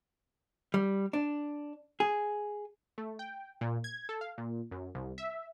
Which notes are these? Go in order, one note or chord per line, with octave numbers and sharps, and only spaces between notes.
G3
D4
G#4
A3
G5
A#2
G#6
A4
F5
A#2
F#2
C2
E5